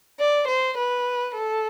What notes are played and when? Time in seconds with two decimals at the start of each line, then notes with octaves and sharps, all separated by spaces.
0.20 D5
0.47 C5
0.77 B4
1.35 A4